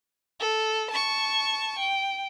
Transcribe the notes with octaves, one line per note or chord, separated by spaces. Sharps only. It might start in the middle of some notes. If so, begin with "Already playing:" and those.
A4
A5 C#6
G5